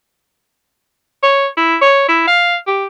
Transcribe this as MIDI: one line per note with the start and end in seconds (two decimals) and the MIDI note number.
1.23 1.47 73
1.57 1.76 64
1.81 2.04 73
2.08 2.25 64
2.27 2.56 77
2.67 2.86 67